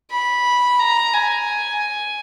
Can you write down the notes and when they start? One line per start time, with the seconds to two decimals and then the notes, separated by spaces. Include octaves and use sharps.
0.11 B5
0.79 A#5
1.14 G#5